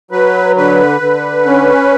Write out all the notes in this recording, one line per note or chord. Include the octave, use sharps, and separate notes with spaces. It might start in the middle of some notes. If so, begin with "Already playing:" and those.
F#3 B4
D3 B4
D3
C#4